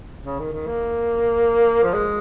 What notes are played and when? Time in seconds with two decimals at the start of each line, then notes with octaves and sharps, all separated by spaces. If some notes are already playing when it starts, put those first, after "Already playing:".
0.24 C#3
0.39 D#3
0.53 D#3
0.67 A#3
1.83 F3
1.93 G#3